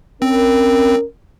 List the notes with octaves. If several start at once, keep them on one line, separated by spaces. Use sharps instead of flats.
C4 C#4 A#4